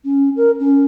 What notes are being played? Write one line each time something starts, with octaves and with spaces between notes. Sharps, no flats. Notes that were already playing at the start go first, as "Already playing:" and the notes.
C#4
A#4
C#4